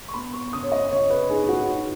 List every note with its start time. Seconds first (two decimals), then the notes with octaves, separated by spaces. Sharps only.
0.08 C#6
0.14 B3 B5
0.34 C#6
0.53 C#3 D#6
0.63 C#5
0.72 D#5
0.91 C#3 C#5
1.10 B4
1.29 D#4 G#4
1.49 F#4
1.68 D#4